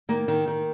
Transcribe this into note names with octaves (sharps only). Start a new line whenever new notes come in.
D#3 A#3
D#3
D#3